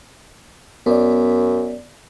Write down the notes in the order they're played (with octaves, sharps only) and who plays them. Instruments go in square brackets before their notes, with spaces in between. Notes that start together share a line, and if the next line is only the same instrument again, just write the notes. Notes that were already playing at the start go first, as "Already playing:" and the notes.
[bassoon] F#2 [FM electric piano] B3 D5